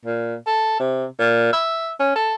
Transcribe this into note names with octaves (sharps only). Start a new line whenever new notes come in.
A#2
A4
C3
A#2
E5
C#4
A4